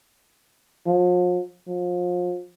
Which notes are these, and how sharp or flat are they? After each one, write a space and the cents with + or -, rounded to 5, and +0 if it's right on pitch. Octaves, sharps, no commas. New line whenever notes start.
F3 +40
F3 +30